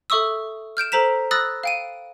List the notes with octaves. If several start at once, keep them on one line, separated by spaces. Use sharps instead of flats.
A4 E5 C#6 D#6 E6
F6 G6 D7 E7
A4 C5 A#5 B6 E7
B5 D#6 E6 F#6 A6 A#6
F5 G5 D#7